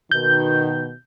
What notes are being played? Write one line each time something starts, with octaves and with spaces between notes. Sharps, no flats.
B2 D#3 G6